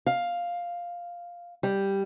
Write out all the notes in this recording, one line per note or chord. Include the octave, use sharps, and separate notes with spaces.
F5
G3